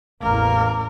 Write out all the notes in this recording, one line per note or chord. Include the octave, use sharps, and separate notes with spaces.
A1 E2 A#3 A#4